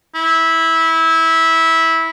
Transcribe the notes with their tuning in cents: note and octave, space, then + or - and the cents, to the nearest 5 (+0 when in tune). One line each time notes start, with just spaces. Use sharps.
E4 -15